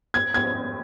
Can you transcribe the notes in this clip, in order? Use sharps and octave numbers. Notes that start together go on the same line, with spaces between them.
G#6
G#6